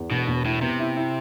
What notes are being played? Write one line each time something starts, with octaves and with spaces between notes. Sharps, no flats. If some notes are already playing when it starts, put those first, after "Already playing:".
Already playing: E2
E1 B2
E1
A2 E4
C3 B3
E4
E4